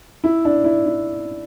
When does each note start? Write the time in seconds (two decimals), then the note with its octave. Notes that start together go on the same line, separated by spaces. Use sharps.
0.24 E4
0.45 D4
0.64 E4
0.86 E4